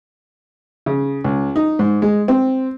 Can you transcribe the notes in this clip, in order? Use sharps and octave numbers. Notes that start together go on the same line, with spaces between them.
C#3
C#2
D#4
G#2
G#3
C4